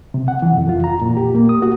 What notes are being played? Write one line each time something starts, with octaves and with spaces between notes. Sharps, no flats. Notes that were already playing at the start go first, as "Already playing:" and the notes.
C3
F#5
E3
F2
F4
A#5
A#2
G4
A#3
D#6
F#4